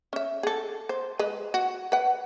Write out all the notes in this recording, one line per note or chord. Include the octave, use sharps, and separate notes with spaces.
C#4 E5
G#4 A4
C5
G#3 B4 D#5
F#4
B4 F#5